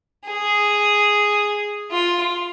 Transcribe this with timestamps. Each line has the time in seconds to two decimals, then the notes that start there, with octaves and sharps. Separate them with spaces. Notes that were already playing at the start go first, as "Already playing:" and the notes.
0.27 G#4
1.92 F4